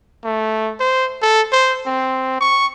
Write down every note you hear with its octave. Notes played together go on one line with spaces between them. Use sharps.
A3
C5
A4
C5
C4
C#6